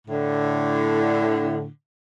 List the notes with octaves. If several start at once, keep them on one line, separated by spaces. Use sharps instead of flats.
A2 D3